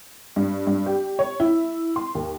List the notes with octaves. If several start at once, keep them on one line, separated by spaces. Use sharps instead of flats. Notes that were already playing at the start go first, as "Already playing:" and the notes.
G2
G2
G4
C#5
E4
C6
D#2